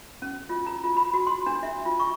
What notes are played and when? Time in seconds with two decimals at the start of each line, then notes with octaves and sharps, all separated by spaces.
0.22 C#4
0.49 F4
0.67 A#5
0.84 F4
0.97 B5
1.14 F#4
1.27 C6
1.46 D4
1.63 E5
1.85 F4
2.00 C#6